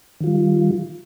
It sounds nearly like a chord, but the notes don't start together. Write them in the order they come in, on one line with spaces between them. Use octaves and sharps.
D#3 F4 G3